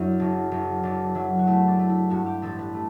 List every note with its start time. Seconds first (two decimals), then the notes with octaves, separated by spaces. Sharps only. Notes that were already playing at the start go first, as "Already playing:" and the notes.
Already playing: F#2 D4 E4
0.20 F#1
0.51 F#1
0.83 F#1 D4
1.15 F#3 E4
1.39 F#4
1.47 A3 E4
1.68 D4
1.79 A3
1.90 E4
2.10 G2 F#4
2.26 G4
2.42 A1 A4
2.59 B4
2.74 A3